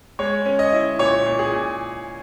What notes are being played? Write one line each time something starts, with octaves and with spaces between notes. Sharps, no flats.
G#3 C#5
C#4
D#5
E4
A#2 C#5
A#2
G#4
A#2